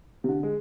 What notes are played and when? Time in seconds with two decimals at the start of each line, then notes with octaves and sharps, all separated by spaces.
0.24 C3
0.29 D3
0.43 G#3